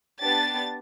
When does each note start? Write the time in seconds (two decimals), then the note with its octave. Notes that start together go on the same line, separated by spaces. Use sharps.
0.21 B3 D4 G4 A6